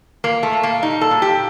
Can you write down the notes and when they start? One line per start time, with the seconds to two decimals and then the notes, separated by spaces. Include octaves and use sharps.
0.24 A#2 A#3
0.43 A3
0.53 A#2
0.63 A#3
0.82 G3 D#4
1.01 A4
1.11 A#2
1.22 G4